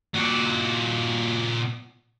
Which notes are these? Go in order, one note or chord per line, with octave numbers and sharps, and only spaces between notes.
A#2 F#4